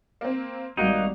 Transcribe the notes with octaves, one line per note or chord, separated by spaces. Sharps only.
A#3 C4
G#1 G3 A#3 D#4 F#4